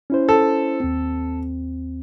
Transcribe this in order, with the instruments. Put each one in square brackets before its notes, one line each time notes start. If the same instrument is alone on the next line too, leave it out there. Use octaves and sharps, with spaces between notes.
[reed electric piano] C#4 E4 C5
[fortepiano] A4
[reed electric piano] D#2 C4